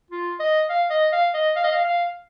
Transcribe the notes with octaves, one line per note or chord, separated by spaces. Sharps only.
F4
D#5
F5
D#5
F5
D#5
F5
D#5
F5
F5